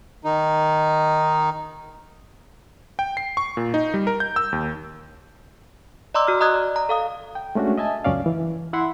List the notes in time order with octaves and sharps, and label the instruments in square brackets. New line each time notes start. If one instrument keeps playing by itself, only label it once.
[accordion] D#3 D#4
[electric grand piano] G5
C7
C#6
A#2
D#4
G3
A#4
G6
E6
D#2
[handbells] D5 D#5 A#5 C6 D6 E6
F#4 F6
D#5 A#5 D#6 F#6 G#6
D5
A#5
A4 F5 D#6
[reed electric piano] G5
G#3 A3 C#4 D4 F#4
D#5 E5 G#5 A5
C#2 F#2 C#4 D5 F5
E3
E4 E5 F#5 B5 C6